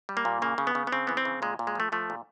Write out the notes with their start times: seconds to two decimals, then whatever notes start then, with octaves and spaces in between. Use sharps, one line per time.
0.09 G3
0.17 A#3
0.25 A#2
0.42 C#3 A#3
0.58 C#3
0.67 B3
0.75 C#3
0.87 B3
0.92 C#3 C4
1.07 E3 B3
1.17 C4
1.25 C#3
1.42 A#2 G#3
1.59 A#2
1.67 G#3
1.75 F3 A3
1.92 F3 A3
2.10 A#2